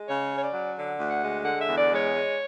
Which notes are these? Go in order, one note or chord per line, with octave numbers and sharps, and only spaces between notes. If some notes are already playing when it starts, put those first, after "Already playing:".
Already playing: G#3
C#3 C#5
C#4
C#5
D5
F#3
D3
D2
F#5
G#3
D3 F#5
E5
E2
D5
G#3 C#5
G#3